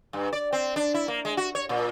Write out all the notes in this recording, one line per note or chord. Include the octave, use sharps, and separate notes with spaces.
G2
D5
C4
D4
E4
A#3
G#3
F#4
C#5
A#2